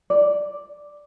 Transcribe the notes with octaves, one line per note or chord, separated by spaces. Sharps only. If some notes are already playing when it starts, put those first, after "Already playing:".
D5